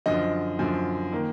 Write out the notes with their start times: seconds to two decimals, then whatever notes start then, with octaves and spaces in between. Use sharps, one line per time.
0.06 F#2 D3 F3 D#5
0.59 F#2 D3 F3
1.12 D#3 A#3